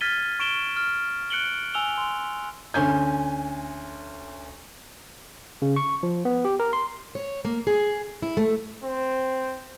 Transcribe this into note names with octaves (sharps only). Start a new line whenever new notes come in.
F6 G#6 A6 B6 D#7 G7
C#6 D7 E7 G7
F6
F#6 C#7 D7 F#7 G7
G#5 E6 F7 G7
C6
D2 C#4 G#5 G6
C#3
C#6
F3
B3
G4
A#4
C6
C#5
A#3
G#4
E4
A3
C4